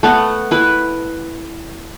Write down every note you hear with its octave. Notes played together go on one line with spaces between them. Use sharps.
A3 B3 F#5
E4 B4